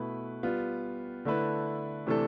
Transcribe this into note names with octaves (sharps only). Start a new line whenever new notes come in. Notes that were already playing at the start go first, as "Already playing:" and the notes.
Already playing: B2 A3 E4 B4
G3 B3 F4
D3 A3 E4 B4
C3 E3 A3 D4 A4